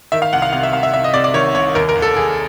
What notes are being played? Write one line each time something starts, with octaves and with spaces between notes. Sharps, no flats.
D#3 E5
F5
C2 F#5
F5
C3 F5
E5
C2 F5
E5
C2 E5
D#5
C3 D5
D5
D#3 C#5
C2 C#5
D#2 A#4
A#4
D#2
A4
D#2 G#4